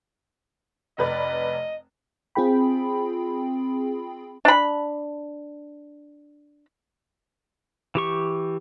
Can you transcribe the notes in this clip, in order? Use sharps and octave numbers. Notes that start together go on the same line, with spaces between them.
F1 B4 D5 D#5
C4 F4 G#4 G5 B5
D4 B5
E3 G4 C#6